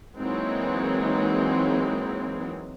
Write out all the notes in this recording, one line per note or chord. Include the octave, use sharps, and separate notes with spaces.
E3 F#3 G#3 A#3 C4 D#4